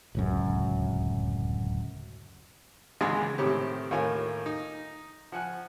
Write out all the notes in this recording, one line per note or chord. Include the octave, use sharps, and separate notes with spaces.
D1 C#2 F#2
G#1 C#2 G#2 E3 G#3 C6
A2 C3 D#3 C4 G4
D#2 A2 F4 A#4 G#5
D#4
F3 F#5 G#5 F#6